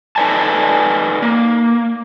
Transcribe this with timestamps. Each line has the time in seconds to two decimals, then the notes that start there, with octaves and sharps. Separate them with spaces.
0.16 D#4 A4 B4 D5 G#5 A5
1.22 A#3